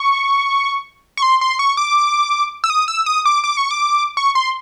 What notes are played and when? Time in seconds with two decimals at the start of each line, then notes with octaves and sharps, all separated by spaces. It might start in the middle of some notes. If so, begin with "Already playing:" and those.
Already playing: C#6
1.17 C#6
1.22 C6
1.41 C6
1.59 C#6
1.77 D6
2.64 E6
2.70 D#6
2.88 E6
3.06 D#6
3.26 D6
3.44 D6
3.57 C#6
3.71 D6
4.17 C#6
4.35 C6